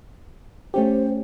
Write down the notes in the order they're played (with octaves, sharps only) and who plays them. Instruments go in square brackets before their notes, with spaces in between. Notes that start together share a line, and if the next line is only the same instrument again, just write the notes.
[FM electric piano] A3 C#4 G4 [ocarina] C5